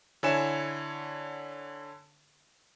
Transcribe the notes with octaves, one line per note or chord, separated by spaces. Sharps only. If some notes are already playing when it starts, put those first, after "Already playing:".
D3 E4 C#5 G#5 E7